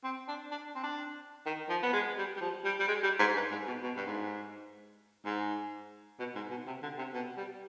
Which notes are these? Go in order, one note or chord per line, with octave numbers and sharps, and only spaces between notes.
C4
D4
D4
C4
D4
D#3
F3
B3
G#3
G3
G3
F3
G3
G3
G#3
G3
G#2
G2
G#2
B2
B2
G2
G#2
G#2
B2
G#2
B2
C3
D3
C3
B2
G3